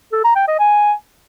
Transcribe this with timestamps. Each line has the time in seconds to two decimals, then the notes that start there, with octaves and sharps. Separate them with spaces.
0.12 A4
0.24 A#5
0.36 G5
0.47 D#5
0.59 G#5